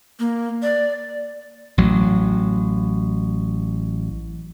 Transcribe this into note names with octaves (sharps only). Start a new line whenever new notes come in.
A#3
D5
A1 F#3